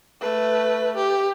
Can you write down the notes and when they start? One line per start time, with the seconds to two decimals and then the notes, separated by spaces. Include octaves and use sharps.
0.21 A3 B4
0.96 G4